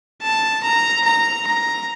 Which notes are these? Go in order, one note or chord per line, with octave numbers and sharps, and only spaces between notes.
A5
A#5
A#5
A#5